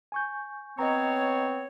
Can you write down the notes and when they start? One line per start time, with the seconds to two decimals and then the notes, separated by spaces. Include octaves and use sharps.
0.12 G#5 C#6 G6
0.79 B3 C4 C#5 D#5 A#5